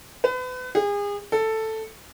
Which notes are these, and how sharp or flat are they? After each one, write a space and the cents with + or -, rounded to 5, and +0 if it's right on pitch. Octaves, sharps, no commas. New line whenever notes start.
B4 +35
G#4 -35
A4 +5